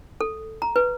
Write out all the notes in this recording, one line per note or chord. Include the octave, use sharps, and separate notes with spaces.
A4
A#5
B4